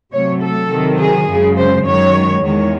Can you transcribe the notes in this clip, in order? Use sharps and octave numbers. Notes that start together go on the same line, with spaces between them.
C3 F#3 A3 C#5
A4
C3 D#3 F#3
G#4
F#2 C#3 G#3
C5
F#2 D#3 G#3 C#5
E2 D#3 G#3 C#5